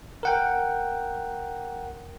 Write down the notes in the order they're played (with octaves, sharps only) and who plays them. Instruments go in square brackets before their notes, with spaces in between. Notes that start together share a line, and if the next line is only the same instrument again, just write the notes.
[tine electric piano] A#4 F#5 G5